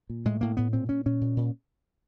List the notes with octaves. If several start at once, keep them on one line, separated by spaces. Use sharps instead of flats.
A#2
A2 G#3
A2 A#3
A2 B3
A#2 C4
A#2 C#4
A#2 C#4
A#2
A#2